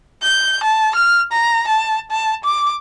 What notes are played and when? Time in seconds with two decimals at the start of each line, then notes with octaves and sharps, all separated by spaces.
0.22 G6
0.64 A5
0.95 F6
1.32 A#5
1.68 A5
2.11 A5
2.44 D6